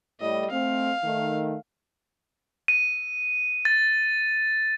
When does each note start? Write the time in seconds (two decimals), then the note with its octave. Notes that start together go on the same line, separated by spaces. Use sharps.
0.20 A2 G3 D#5
0.51 A3 C4 F5
1.04 D#3 A3
2.68 D#7
3.65 A6